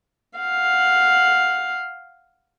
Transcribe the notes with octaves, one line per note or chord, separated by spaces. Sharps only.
F5 F#5